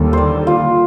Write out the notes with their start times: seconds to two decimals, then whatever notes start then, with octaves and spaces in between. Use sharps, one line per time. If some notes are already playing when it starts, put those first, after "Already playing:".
Already playing: D#2 D3 G3
0.13 C5 D5
0.47 F4